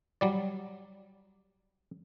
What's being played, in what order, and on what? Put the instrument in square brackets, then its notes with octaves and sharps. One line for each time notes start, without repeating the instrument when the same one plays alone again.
[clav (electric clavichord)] F#3 G3 D5